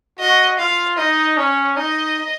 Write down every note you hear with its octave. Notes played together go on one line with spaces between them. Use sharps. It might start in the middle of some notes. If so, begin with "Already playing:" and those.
F#4 D#5
F4 F5
D#4 D#5
C#4 C#5
D#4 D#5